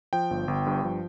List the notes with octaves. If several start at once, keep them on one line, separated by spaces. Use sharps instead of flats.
F3 G5
G1
G1
G2
F3